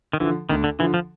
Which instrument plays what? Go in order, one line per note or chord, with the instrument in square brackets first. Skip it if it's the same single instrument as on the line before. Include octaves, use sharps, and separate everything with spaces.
[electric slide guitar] D#3
[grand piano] D3 F3 [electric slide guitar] E3
[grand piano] D2 [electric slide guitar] D#3
[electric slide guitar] D3
[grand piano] D3 F3 [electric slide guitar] E3
[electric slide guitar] F3